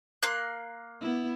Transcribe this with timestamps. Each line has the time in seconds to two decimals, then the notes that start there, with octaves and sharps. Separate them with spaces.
0.23 A#3 C6 F#6
1.01 B3 E4